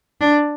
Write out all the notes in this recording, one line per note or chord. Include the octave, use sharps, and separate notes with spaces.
D4